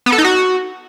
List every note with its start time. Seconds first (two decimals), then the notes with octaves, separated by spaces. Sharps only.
0.06 B3
0.12 A4
0.18 D#4
0.24 F#4